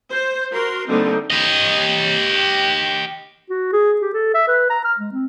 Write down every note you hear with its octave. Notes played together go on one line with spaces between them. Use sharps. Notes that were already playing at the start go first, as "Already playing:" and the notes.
C5
F#4 A#4 C6
D3 G3 A3 A#3 C4 D#4
G4 D#5
F#4
G#4
G4
A4
E5
B4
A#5
F6
G#3
C4